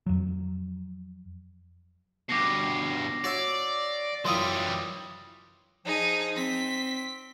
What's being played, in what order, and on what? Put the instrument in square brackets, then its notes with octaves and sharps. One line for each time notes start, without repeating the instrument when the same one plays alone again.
[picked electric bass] F2 F#3
[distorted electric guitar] G2 B2 [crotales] D6 A#6 C7
[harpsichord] F#4 C#5 E5 [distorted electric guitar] D5
[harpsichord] F#2 E4 F4 [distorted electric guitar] E3 G3 [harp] C6 D#6
[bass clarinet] F3 [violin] D#4 G#4
[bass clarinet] C4 [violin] B6